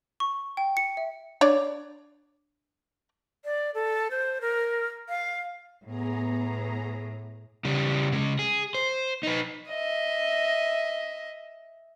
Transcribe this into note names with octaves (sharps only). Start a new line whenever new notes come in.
C#6
G5
C#7
E5
D4 C#5 D5
D5
A4
C5
A#4
F5
A2 B3 G#4 A#5
C#3 G3
C#3 G#3
G#4
C5
D#4 B4
D#5 E5